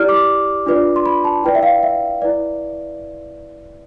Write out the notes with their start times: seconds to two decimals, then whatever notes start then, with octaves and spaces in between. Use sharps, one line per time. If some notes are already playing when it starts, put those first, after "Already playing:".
Already playing: E4 G4 D5 F6
0.09 D6
0.66 D4 F4 B4 D5
0.96 C6
1.06 B5
1.24 A5
1.44 E4 B4 D5 G5
1.55 E5
1.63 F5
1.83 E5
2.22 E4 B4 D5